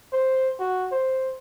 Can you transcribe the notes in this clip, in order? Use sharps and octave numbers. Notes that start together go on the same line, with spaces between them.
C5
F#4
C5